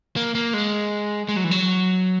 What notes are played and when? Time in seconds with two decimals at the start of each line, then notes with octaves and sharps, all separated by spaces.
0.16 A#3
0.35 A#3
0.54 G#3
1.29 G#3
1.36 F#3
1.44 E3
1.51 F#3